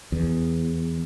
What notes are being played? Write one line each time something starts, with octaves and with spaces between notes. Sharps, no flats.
E2